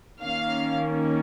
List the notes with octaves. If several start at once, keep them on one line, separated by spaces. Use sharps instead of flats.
D#3 A#3 C#4 F5